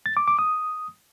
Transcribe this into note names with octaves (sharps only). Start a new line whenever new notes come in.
A6
D6
D6
D#6